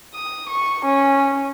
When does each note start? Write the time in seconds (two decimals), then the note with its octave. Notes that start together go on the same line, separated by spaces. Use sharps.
0.14 D#6
0.49 C#6
0.85 C#4